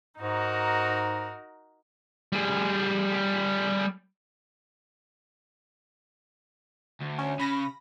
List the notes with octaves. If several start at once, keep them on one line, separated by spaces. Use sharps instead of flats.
G#2 D#4 F#4 A#4
G3 G#4
D2
C#4
C#3 B5 A#6